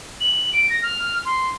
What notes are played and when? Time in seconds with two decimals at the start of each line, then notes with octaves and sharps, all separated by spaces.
0.20 F#7
0.53 D7
0.69 A#6
0.82 F6
1.25 C6